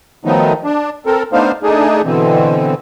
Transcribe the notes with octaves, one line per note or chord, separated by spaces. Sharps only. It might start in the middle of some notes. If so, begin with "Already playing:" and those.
D#3 F3 F#3 A3 B3 D#4
D4
C4 A4 A#4
A3 B3 D4 D#4 C5 F5
A3 D4 D#4 G#4
B2 D3 E3 C4